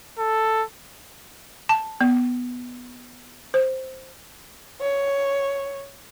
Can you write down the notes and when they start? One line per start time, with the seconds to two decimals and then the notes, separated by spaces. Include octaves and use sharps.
0.19 A4
1.69 A5
2.01 B3
3.54 C5
4.80 C#5